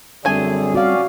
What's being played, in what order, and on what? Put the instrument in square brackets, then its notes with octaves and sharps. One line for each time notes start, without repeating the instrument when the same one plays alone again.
[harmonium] F#2 D3 G#4 [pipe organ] G3 C4 [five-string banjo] A3 G#5
[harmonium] C#4 D5 [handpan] F#4 F5